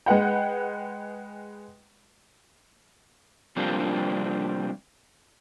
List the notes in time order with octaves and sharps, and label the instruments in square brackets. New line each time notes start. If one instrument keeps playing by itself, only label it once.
[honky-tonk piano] G#3 B4 F#5 G5
[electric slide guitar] C3 F3 G3 A#3 C4 D4